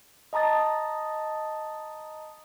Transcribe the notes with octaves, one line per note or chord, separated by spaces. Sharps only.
D#5 A5 A#5 D#6 A6